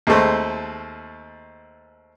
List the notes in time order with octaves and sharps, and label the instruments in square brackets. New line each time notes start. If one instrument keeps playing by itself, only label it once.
[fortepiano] D#2 G#3 A3 C4